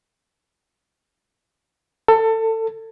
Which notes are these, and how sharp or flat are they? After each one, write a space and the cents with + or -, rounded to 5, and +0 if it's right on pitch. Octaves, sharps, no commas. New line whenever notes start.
A4 +25